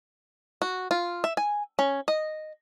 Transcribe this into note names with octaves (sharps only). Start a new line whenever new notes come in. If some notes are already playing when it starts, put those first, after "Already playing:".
F#4
F4
E5
G#5
C#4
D#5